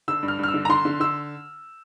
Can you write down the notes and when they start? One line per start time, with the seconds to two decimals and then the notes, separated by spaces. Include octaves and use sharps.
0.08 D3 E6
0.23 G2
0.28 F6
0.39 G2 F6
0.48 E6
0.54 D3
0.65 A#5
0.69 D3 C6
0.85 D3
1.00 D3 E6